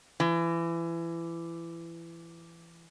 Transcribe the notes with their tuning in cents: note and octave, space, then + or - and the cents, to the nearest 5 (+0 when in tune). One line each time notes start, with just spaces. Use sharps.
E3 +25